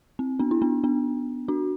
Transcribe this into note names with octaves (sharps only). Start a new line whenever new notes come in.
C4
B3 D4
E4
B3 D4
B3 D4
D4 F#4